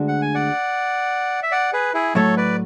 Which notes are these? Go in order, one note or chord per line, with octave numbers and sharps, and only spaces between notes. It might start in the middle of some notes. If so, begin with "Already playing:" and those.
Already playing: D2 D3 G#3 D4 F#4
F#5
G#5
D5 F#5
E5
D5 F#5
G#4 B4
E4 G#4
A2 F#3 A3 A4 C#5
B4 D5